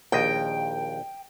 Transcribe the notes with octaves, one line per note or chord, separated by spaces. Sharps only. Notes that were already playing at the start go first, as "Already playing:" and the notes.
A#1 D#2 D#5 G5